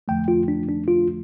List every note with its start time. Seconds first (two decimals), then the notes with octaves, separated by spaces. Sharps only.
0.08 F2 D3 F3 A3 G5
0.28 F4
0.48 D4
0.69 D4
0.88 F4